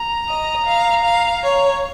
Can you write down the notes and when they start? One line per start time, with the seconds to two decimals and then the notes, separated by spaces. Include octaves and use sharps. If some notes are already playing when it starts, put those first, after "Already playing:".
Already playing: A#5
0.28 D#5
0.66 F5
1.04 F5
1.43 C#5